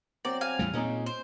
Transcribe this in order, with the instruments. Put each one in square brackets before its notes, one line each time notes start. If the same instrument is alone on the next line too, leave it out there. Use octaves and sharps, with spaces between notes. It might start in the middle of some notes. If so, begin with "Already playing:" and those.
[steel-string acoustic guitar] F#3 C4 [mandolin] D5
[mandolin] F5 G#5
[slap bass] E2 A2 G3
[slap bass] A#2 C4 [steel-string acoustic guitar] G#3 C#4 D#4
[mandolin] C5